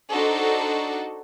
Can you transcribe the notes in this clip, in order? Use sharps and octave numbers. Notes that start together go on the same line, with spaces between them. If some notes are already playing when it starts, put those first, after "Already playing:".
D4 D#4 F#4 A4 C5